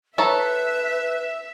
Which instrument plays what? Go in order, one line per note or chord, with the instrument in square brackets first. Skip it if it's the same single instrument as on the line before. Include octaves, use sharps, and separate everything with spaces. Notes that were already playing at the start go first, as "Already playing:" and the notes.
[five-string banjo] E4 C#5 A#5 [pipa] A4 [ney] B4 [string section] E5